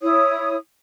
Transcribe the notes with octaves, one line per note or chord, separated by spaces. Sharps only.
E4 C#5 D#6